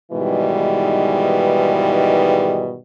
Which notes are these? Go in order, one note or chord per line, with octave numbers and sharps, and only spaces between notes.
G#2 B2 D#3 E3 G3 G#3